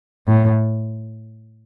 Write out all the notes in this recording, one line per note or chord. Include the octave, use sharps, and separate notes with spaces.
A2